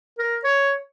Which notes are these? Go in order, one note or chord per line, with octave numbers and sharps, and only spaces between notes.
A#4
C#5